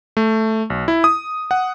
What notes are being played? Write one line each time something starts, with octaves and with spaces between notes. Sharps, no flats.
A3
B1
E4
D#6
F#5